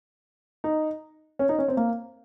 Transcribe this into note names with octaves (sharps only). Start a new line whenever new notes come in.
D#4
C#4
D#4
C#4
C4
A#3